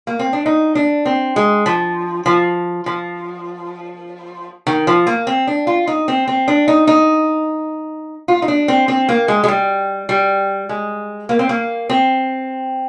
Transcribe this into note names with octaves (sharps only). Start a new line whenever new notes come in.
A#3
C4
D4
D#4
D4
C4
G#3
F3
F3
F3
D#3
F3
A#3
C4
D4
F4
D#4
C4
C4
D4
D#4
D#4
F4
D#4
D4
C4
C4
A#3
G#3
G#3
G3
G3
G#3
A#3
C4
A#3
C4